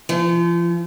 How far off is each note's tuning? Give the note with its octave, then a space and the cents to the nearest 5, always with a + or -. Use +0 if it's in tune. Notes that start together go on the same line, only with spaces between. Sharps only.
F3 -35